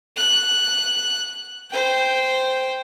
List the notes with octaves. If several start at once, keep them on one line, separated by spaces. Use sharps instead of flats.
F#6
C5 G5